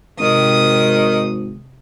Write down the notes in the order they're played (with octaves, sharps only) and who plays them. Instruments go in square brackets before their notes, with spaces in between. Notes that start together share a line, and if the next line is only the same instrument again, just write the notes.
[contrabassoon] G#1 [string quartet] C3 D#6 [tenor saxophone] D#3